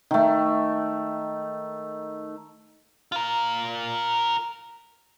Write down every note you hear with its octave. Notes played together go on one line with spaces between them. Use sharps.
D#3 A3
F4 A#4